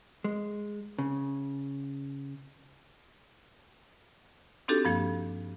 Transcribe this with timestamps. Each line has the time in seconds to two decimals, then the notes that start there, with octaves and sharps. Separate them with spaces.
0.24 G#3
0.98 C#3
4.68 C4 D4 D#4 F#4 G4 A4
4.85 G2 F3 A#3 G#6